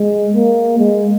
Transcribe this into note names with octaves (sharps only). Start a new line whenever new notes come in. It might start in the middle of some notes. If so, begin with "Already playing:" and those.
Already playing: G#3
A#3
G#3